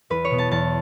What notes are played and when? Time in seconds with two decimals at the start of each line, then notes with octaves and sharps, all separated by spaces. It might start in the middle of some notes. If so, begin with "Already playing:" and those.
0.10 E2 B4
0.25 C#5
0.31 B2 B3
0.38 A5
0.51 E2 A5